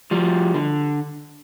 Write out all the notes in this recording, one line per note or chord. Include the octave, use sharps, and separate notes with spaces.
F3 G3
D3